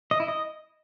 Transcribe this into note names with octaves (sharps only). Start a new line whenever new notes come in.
D#5
E4
D#5